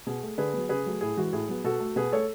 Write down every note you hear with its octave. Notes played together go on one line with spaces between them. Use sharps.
B2 G#4
A3
D3 G#4 B4
F#3 B3
C#3 G#4 B4
F#3 A3
A2 G#4
E3 G#3 F#4
A2 G#4
F#3 B3
B2 F#4 A4
A3
B2 G#4 B4
A3 A4 C#5